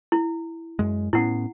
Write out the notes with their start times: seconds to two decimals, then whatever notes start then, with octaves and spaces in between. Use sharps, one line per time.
0.12 E4
0.79 F#2 G#3
1.13 A2 B3 C#4 E4 F#5